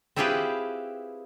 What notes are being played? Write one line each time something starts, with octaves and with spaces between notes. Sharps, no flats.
C4 E4 F4 G4 G#4 B4